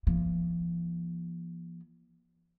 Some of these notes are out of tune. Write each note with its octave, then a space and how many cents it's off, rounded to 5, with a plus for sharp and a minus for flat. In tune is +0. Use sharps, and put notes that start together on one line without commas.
F3 -40 A#3 +40